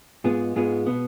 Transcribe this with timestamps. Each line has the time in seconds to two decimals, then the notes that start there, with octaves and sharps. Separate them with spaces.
0.24 G#2 G#3 B3 F4 G#4
0.56 G#2 G#3 B3 F4 G#4
0.86 B2 B3